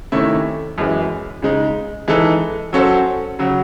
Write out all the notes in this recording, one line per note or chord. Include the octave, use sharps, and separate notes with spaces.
C3 D#3 A3 C#4 E4
F#2 E3 G#3
C#3 G#3 D#4
E3 G#3 D#4 A4
F#3 C#4 F#4 A4 C5
C#3 F#3